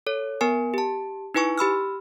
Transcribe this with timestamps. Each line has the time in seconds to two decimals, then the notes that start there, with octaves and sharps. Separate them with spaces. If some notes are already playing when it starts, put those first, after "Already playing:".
0.07 A4 C#5
0.41 B3 A#4 G#5
0.74 G4 A5
1.35 D#4 E4 B4 G#5 C#6
1.58 G4 B5 E6 F6